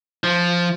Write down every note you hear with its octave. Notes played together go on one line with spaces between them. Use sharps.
F3